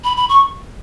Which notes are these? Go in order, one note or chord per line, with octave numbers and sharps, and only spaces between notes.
B5
B5
C#6